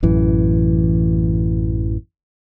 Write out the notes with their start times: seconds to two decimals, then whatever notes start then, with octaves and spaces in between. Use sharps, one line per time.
0.03 A1 F#2 E3